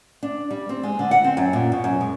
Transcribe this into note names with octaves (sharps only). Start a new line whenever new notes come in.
D4
G3
C4
G#3
D3
F#5
C4
F#2
A#2
B2
F#2
G#3